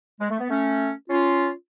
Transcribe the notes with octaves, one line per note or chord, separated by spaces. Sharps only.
G#3
A3
B3
A3 C#4
C#4 F4